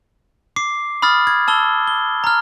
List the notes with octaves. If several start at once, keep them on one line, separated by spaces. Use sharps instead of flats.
D6 C7
B5 D#6 F6 A6
G#6
A5 E6 G7
G7
A#5 F6